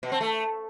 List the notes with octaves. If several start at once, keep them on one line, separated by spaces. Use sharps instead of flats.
B2
C4
A3